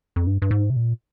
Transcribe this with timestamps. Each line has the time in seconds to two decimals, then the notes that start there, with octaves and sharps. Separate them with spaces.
0.16 F2
0.27 G2
0.42 G2
0.51 G#2
0.70 C3
0.76 A#2